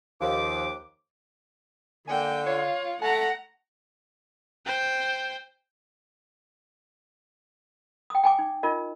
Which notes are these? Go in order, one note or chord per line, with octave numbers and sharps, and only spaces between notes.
D#2 F3 D6
D3 A#3 G5 G#5
F4 C#5 F5
A3 F#5 A5 A#5
C5 G5
G5 D#6
G5 G#5 D6
D#4
D#4 F4 A#4 D#5